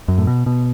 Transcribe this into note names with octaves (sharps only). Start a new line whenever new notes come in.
F#2
A2
B2
B2